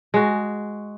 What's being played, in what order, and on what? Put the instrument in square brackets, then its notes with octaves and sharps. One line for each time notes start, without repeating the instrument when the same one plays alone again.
[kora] G#3 F#4